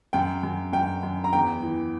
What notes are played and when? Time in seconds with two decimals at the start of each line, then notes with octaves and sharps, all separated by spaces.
0.13 F#2 G5
0.43 F#2
0.73 F#2 G5
1.03 F#2
1.24 A#5
1.33 E2 G5
1.63 E3